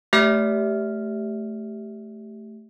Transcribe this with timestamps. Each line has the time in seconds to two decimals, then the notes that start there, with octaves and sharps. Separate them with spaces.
0.13 A3 G4 E5 F6 B6